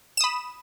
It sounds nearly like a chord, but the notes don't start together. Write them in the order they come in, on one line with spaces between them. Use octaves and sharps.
E7 D#6 B5